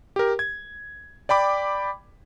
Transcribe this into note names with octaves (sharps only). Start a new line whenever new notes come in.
G4 A#4
G#6
D5 G5 B5 D6